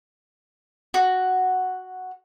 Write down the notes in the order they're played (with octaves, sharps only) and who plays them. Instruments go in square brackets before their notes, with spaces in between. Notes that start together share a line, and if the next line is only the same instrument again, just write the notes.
[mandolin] F#4